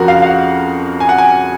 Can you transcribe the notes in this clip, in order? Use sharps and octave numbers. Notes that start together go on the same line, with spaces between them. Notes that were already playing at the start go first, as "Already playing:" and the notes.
Already playing: F2 C#3 F3 F#4 A#4
F5
F5
F#5
G#5
F#5
G#5